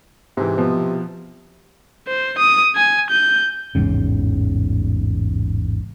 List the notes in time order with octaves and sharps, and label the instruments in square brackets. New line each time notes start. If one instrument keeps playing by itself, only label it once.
[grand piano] G#2 E3 [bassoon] C3
[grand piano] B2 F3 B3
[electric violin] C5
D#6
G#5
G6
[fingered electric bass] A1 E2 G#2 C#3